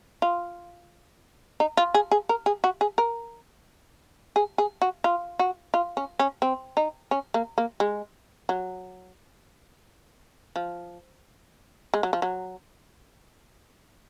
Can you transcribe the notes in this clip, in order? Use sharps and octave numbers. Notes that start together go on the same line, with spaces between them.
F4
D#4
F4
G#4
G#4
A#4
G#4
F#4
G#4
A#4
G#4
G#4
F#4
F4
F#4
F4
C#4
C#4
C4
D#4
C#4
A#3
A#3
G#3
F#3
F3
G#3
F#3
F3
F#3